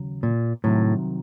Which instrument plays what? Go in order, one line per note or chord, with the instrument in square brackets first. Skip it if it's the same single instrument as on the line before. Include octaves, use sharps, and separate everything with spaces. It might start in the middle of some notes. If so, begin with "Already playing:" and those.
Already playing: [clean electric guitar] D#2 C#3 F#3
[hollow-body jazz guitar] A#2
[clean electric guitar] C2 C3 D#3 F#3 [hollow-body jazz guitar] A2